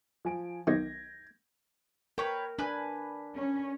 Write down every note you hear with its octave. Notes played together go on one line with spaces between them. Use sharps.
F3 G#5 D7
B1 D#3 G6 G#6 A#6
A#4 B4 C#5 G5
D4 B4 G#5 G6
C#4